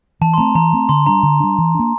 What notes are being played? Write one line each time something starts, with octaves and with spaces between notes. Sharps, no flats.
E3 A5
C6
A3 C4 A#5
E3 A#5
A3 C4
D3 C6
G3 D4 A#5
D3
G3 D4
E3
A#3 D4